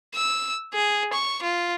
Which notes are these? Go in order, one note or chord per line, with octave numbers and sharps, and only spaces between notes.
E6
G#4
C#6
F4